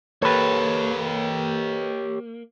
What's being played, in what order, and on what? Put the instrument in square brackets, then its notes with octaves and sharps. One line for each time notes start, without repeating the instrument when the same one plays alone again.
[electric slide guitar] A#3 [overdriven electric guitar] G4 C#5 [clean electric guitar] A4 B4